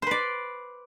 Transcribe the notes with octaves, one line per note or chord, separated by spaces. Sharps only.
B4 C5 D5